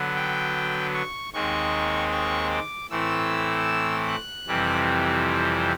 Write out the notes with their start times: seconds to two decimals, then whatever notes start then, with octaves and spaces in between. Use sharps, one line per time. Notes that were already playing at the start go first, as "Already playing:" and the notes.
Already playing: D3 F#3 B3
0.16 G5
0.94 C#6
1.33 D#2 D#3 G#3 C4 D#4 C#6
2.12 C#6
2.51 D6
2.90 A2 E3 A3 C4 E4 E6
4.08 F#6
4.47 F2 C3 E3 G3 C4